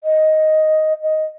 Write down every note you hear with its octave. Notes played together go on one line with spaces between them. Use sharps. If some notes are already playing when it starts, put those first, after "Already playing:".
D#5
D#5